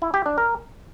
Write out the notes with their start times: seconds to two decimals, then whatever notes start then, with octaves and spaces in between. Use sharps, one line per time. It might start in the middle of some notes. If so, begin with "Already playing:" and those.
0.02 E4
0.14 G4
0.26 D4
0.38 A#4